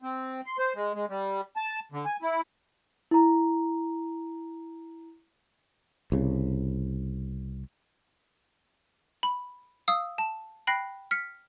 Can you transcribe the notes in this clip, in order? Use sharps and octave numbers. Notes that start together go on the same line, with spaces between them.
C4
C6
C5
G#3
G#3
G3
A5
D3
G#5
E4
E4 A#5
C2 C#3
B5
F5 D#6 E6
A5
G5 B5 F#6 A#6 C7
F6 B6 C#7